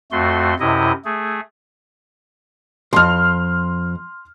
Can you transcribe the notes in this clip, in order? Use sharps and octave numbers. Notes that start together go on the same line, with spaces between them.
F2 A3 F#4 C6
F#2 C3 E4 D#5
A3 G#4
C2 F2 C6 F6